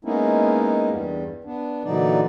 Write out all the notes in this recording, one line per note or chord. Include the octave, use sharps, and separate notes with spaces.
G#3 A#3 B3 C#4 D#4 E4
E2 G2 G3
B3 D4
A#2 D3 E3 F#3 D#4 D5